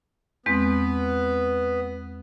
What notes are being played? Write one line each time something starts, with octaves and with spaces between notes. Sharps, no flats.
E2 G#3 B3 C4